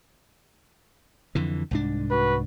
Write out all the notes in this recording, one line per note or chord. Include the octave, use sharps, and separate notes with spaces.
F2 D3 E3
C2 G#2 D4
F#4 B4